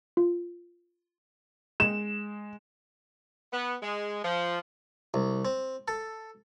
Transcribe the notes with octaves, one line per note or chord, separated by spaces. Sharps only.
F4
G#3 E7
B3
G#3
F3
C2
C4
A4